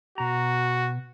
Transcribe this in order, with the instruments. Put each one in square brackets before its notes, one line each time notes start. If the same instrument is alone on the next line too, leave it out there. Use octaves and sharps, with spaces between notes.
[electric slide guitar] B2 A#5 [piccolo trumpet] F#4